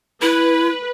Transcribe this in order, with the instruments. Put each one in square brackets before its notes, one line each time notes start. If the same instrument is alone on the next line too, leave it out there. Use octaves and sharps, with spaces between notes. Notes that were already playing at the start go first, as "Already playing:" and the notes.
[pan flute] E4 [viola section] B4